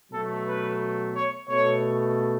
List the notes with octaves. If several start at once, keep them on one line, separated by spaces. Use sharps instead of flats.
B2 F#3 A3 A4
B4
C#5
B2 A3 C#5